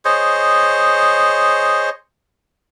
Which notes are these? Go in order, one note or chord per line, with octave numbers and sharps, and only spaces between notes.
G#4 C5 C#5 D#5